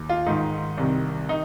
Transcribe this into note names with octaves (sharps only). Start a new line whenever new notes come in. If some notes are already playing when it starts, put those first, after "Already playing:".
Already playing: D#2
F4
G#2 D#3 D#4
C2 C3 D#3
D#3 D#4